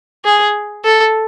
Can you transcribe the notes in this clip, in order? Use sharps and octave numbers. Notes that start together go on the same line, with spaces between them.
G#4
A4